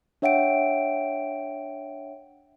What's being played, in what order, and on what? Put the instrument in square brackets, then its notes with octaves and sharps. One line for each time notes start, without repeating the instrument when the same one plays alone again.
[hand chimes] D4 C#5 E5 F#5 G5 D7